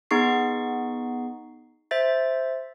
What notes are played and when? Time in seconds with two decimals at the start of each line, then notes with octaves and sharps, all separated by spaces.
0.11 B3 D#4 G#4 C#6 C7
1.91 C5 E5 A6